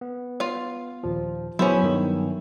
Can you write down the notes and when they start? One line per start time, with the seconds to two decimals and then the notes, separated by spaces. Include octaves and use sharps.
0.01 B3
0.40 F4 F5
1.03 D#2 A#2 F3
1.59 F#3 B3 C#4 E4 G#4 C5
1.81 G2 D#3